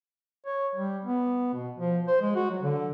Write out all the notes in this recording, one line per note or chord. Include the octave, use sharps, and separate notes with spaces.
C#5
G3
B3
B2
F3
C5
G#3
F#4
F#3
D3